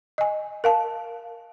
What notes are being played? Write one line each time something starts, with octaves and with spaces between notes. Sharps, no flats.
D#5 G#5
A#4 F5 A5